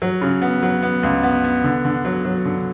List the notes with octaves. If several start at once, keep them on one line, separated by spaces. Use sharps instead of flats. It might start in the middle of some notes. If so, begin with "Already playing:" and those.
F#3
C#3
B3
F#3
B3
C#2
B3
B3
D3
D3
F#3
F#3
D3